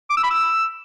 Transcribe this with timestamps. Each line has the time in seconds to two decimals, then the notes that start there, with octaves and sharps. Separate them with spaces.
0.10 D6
0.17 E6
0.24 B5
0.30 E6